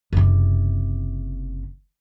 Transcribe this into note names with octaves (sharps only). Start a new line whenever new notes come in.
F#1 C3